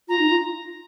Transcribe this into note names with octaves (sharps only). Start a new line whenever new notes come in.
F4 A#5
D#4
F4